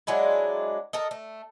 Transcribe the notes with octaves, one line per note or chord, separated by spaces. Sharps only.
F#3 G#3 D4 E4
A4 A#4 D#5
A3